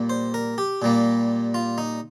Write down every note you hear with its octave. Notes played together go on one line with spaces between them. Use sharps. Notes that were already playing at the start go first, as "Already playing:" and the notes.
Already playing: A#2 G3 A#3
C5
A#4
G4
A#2 G3 A#3
F4
D#4